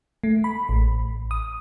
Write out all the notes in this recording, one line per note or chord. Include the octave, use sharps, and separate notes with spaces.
A3
B5
A1
D#6